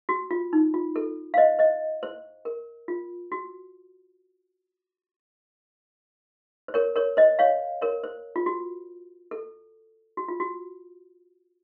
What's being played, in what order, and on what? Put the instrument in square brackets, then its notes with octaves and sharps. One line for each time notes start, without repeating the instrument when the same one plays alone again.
[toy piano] F#4
F4
D#4
F4
A4
F5
C5 D#5
C5 D#5
C5
A#4
F4
F#4
C5
A#4 C#5
A#4 C#5
C5 D#5
C#5 F5
A#4 C#5
C5
F4
F#4
A4
F#4
F4
F#4